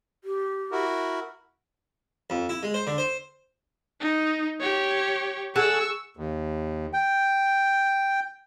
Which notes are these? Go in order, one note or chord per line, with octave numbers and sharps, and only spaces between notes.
G4
E4 F#4 A#4
F2
E4
G#3
C5
D3
C5
D#4
G4 C#5
G#4 A4 F#5 C#6 E6
D#2
G5